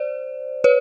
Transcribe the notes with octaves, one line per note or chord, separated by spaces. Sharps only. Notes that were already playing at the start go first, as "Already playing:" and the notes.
Already playing: C5 D5
B4 C#5